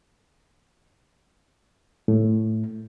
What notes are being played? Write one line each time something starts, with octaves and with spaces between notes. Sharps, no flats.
A2